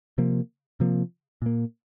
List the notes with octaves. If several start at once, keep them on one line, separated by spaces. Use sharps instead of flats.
C3 F3 A#3
C3 F3 A#3
A#2 A#3